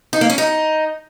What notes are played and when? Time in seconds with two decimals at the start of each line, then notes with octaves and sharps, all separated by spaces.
0.13 D#4
0.21 A#3
0.30 C#4
0.38 D#4